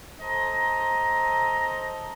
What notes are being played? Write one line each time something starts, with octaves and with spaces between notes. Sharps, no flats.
A4 C5 D#5 A#5